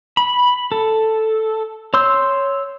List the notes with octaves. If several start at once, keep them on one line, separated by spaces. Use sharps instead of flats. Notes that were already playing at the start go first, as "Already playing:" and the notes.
B5
A4
C#5 C6 E6 G6